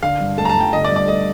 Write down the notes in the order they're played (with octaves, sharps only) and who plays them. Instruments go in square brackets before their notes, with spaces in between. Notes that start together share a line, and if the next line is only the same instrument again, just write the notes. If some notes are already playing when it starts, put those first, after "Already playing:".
[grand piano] D3 [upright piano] F5
[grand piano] G2
[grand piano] A3 [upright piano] A5
[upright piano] A#5
A5
[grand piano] G1
[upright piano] G5
[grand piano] D3 [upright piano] D#5
[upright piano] D5
[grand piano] G2
[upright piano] D5
[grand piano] A3 [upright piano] D#5